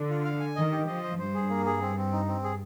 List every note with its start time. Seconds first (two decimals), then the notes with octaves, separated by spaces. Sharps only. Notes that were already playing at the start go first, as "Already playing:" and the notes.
Already playing: D3
0.10 F4
0.25 F5
0.40 G#5
0.56 D#3 D#5
0.72 G4
0.87 F3 D#5
1.03 C5
1.19 G2 C5
1.35 G#4
1.50 A#3
1.66 G#4
1.81 C4
1.97 C4
2.12 D#4
2.28 C4
2.43 G#4